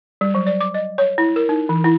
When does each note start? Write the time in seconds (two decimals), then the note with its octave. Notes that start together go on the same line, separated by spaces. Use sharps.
0.21 G3
0.35 F#3
0.47 D5
0.61 D6
0.74 D#5
0.98 C#5
1.18 E4
1.36 A#4
1.49 D#4
1.69 E3
1.84 E4